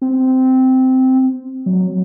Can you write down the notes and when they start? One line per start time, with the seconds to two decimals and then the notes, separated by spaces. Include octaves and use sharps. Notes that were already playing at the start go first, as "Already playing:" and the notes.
0.01 C4
1.66 F#3